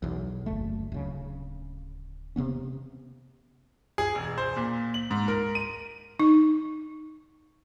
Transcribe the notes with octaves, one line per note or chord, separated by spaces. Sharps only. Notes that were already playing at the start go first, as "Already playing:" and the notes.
B1 E2
F#1 D2 A3
D1 C#3
C3 F#3 B3 C#4
G#4
E1
C5
A#2
F#7
G#2
A#4
D#7
D#4